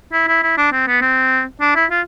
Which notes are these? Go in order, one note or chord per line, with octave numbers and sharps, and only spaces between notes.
E4
E4
E4
D4
C4
B3
C4
D4
E4
F4